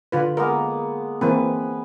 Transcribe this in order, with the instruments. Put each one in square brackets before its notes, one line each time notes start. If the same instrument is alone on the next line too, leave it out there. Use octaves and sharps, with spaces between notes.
[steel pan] D3 F4 B4
[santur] G#3 A#3 B3 [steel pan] A#4
[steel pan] E3 A#3 C4 [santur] B4 G#5